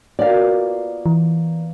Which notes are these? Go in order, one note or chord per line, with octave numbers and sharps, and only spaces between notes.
B2 A#3 F4 D5 F5
E3